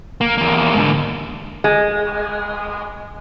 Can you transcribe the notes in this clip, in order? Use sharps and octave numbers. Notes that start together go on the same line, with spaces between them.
A#3
E2 A#3
G#2 D3
G#3